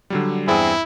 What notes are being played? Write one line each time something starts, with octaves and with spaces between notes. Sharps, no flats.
D3 F#3 G3
E2 G2 C4 E4 G#4